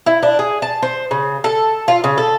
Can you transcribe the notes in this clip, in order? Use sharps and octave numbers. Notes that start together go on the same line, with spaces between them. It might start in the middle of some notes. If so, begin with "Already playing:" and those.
E4
D4
G#4
A5
C5
C#3
A4
F4
C#3
A4